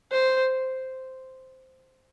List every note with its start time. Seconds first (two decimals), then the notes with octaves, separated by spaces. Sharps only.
0.12 C5